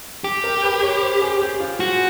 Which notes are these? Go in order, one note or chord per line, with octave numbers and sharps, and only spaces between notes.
G4
A#4
B4
C#5
C5
G#4
G4
F4
F#4